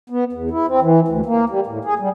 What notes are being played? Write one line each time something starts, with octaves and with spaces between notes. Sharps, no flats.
B3
E2
E4
C4
E3
D2
A#3
G3
A2
G#4
G3